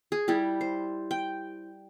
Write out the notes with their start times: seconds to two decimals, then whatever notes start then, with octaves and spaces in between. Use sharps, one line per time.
0.12 G#4
0.28 G3 E4 G4
0.61 C5
1.11 G5